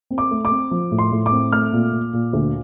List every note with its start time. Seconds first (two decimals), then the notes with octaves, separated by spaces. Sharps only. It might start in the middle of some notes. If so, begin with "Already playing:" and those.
0.10 C4
0.18 D6
0.31 A3
0.45 D6
0.51 C4
0.71 F3
0.91 A2
0.99 C6
1.12 A2
1.26 D6
1.32 C4
1.52 A3 F6
1.72 A#2
1.93 A#2
2.13 A#2
2.33 D2